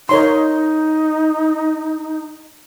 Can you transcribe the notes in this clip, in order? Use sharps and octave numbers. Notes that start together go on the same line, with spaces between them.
D#4 A#4 C#5 C6